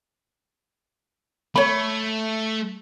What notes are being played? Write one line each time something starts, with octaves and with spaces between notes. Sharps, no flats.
A3 C#5 B5